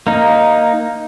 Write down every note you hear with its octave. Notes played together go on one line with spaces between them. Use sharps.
A#3 D#4